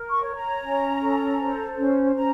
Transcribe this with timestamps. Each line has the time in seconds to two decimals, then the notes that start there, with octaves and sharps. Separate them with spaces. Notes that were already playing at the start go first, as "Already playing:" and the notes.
Already playing: A#4
0.10 C#6
0.23 C#5
0.36 A#5
0.62 C#4
1.00 A4
1.39 C5
1.77 C#4
2.16 C#4 A#5